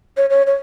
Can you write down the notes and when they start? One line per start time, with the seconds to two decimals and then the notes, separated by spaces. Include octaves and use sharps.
0.17 C#5
0.30 C#5
0.47 C#5